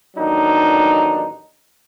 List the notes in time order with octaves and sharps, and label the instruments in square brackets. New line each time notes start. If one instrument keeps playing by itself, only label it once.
[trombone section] A1 D#2 F#3 D4 D#4